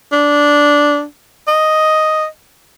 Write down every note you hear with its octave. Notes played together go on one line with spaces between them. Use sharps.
D4
D#5